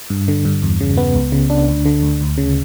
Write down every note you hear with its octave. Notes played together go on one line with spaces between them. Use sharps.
G2
D3
G2
E2
C#3
B3
C#2
C#3
D4
D2
D3
D2
D2
C#3